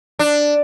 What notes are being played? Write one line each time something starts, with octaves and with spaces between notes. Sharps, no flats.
D4